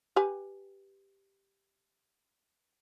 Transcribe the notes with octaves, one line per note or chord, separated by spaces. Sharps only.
G4 B4 G#5